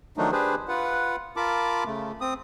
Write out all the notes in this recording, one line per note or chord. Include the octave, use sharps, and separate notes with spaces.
D#3 F3 F#3 A3 D4 D#4
D4 G4 G#4 B4 C5
F4 B4 F#5
F4 A#4 A5 B5 D6
C#3 A3
C4 D#6